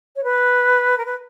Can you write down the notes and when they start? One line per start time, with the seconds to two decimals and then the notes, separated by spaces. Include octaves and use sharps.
0.16 C#5
0.24 B4
0.98 A#4
1.06 B4